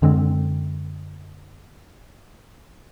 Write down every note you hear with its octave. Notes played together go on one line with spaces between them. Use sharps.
F#2 D3 G#3 C4